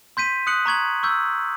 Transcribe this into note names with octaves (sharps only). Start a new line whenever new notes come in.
C6 G6 B6 D#7
D#6 F#6 C#7 F#7
A#5 C#6 G#6 F#7
C#6 E6 G6